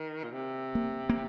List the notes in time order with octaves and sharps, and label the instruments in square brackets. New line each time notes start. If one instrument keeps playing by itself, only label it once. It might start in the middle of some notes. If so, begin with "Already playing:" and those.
Already playing: [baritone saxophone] D#3
A#2
C3
[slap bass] A#3
A#3